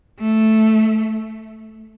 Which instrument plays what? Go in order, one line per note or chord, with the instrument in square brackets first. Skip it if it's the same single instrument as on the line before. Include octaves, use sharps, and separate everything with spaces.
[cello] A3